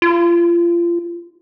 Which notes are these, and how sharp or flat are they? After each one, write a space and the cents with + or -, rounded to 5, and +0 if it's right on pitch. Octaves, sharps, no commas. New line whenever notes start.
F4 -30